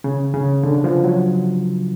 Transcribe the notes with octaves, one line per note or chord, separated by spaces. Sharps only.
C#3
C#3
D3
F3
F#3